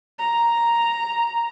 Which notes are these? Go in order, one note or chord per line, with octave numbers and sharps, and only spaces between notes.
A#5